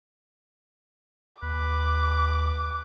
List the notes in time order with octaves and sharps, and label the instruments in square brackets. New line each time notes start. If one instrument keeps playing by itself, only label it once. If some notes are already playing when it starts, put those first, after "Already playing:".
[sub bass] D#2 [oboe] B4 [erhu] D6